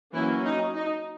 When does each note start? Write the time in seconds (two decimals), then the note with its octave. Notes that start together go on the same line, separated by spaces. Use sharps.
0.13 E3 F#3 A#3 C#4 E4
0.44 D#4
0.76 D#4